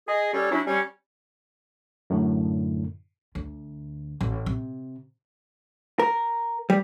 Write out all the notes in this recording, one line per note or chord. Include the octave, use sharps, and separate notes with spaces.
G#4 D#5
G3 C#4 A4 C#5 D5
F#3 C#4 D4 E4
G3 C#4
F#2 A2 D3
D2
A1
C3
A#4
G3